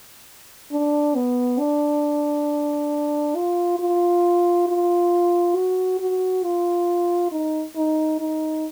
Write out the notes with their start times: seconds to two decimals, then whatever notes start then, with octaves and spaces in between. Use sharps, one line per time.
0.71 D4
1.16 B3
1.59 D4
3.36 F4
3.80 F4
4.68 F4
5.56 F#4
6.00 F#4
6.44 F4
7.32 D#4
7.77 D#4
8.20 D#4